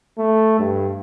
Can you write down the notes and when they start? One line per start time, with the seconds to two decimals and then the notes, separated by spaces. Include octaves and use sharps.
0.18 A3
0.60 G2